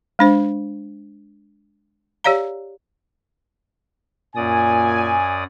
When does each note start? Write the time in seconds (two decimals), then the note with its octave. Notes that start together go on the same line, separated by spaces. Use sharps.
0.19 G#3 D4 C5
2.24 G4 C#5 D5 F5 A#5
4.36 F#2 A#2 D5 G#5 D#6